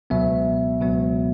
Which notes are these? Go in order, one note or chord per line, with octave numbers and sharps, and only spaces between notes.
C#2 B2 F#3 B3 E5
C#2 B2 F#3 B3